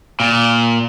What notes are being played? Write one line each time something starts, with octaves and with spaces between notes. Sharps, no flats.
A#2